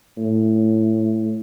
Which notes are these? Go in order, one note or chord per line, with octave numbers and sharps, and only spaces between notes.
A2